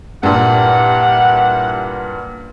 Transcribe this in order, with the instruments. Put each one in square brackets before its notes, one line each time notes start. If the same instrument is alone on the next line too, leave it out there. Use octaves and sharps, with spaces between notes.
[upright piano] G2 A#2 [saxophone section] E4 G4 F#5